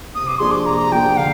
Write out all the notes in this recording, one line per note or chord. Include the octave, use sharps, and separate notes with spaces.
C3 D#6
D6
F3 A#3 D4 G#4 C6
D6
C3 A#5
F3 A#3 D4 G#4 G5
D3 F5